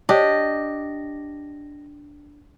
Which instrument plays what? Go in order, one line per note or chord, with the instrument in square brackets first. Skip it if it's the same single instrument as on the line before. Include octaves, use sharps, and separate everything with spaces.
[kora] D4 G4 [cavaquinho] D#5